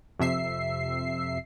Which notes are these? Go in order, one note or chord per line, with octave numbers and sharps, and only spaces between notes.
F2 C3 E5 C7